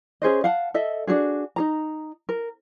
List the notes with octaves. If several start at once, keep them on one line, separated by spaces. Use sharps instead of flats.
C#4 G#4 C5 D#5
F5 F#5 A5
A4 D#5 E5
D4 D#4 F#4 G#4
D#4 G#4 A#5
A#4